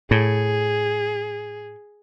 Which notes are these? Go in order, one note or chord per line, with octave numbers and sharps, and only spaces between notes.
A2 G#4